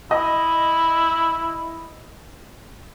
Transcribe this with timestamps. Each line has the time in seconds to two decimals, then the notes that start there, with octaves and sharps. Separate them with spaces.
0.11 E4 D#5